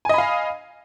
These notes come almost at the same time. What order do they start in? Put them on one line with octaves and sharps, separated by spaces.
G#5 D#5 B5 F5